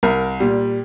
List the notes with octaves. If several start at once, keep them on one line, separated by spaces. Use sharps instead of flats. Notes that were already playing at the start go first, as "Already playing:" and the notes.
C2 A#4
A#2 G3